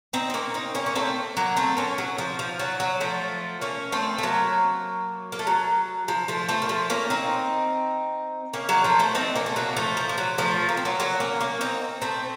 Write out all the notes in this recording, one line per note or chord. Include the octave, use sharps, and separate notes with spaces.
C4 D#4
C4
A#3 C#4
C4 D#4
A#3 C#4
C#4
A3 C4
F#3 A#3
A3 C4
A#3 C#4
F#3
F3
F3
F#3
F#3
F3 A3
A#3 C#4
A3 C4
A3
F#3 A#3
A#3
A3
F#3
F3
F3 A3
A3 C4
A#3
F3 A3
A#3 C#4
C4 D#4
A#3 C#4
F#3 A#3
F3 A3
A3 C4
C4 D#4
A#3 C#4
A3
F#3 A#3
F3 A3
F3
F3
F#3
F3 A3
A#3
C4
F#3 A#3
F#3 A#3
A#3 C#4
A#3 C#4
C4 D#4
A3 C4